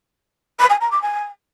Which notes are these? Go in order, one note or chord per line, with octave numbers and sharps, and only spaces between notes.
B5
G#5
A#5
D6
G#5